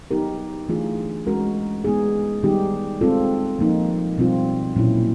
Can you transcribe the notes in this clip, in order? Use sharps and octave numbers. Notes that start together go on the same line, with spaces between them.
F#3 B3 D#4 G4 A#4
E3 A3 D4 F4 G#4
G#3 C#4 F#4 A#4
G#3 B3 D#4 G#4
D#3 G3 B3 D#4 G4
G#3 C4 F4 A4
F3 A#3 D#4
B2 G3 C4 F4
A#2 F#3 A#3 C#4 E4